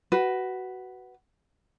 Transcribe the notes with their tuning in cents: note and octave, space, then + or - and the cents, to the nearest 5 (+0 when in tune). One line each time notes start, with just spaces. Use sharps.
F#4 +15 B4 +0